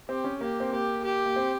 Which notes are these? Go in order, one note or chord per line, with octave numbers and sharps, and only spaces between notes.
C4 G4
C#4
A#3 G4
C4
A#3 G4
G4
A#3
C4